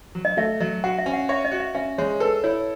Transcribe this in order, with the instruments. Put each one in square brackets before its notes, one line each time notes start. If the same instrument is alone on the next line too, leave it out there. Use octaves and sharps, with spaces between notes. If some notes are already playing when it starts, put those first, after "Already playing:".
[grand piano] F#3
[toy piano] D#5
[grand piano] A3 [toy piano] E5
[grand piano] F#3 [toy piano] D#5
[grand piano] F#4 [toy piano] F#5
[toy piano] E5
[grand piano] C#4
[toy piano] F#5
[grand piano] C#5 [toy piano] E5
[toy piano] D#5
[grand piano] F#4
[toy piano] E5
[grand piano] C#4 [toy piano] E5
[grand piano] G#3 [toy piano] C#5
[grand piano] A4 [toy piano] B4
[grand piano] E4 [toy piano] C#5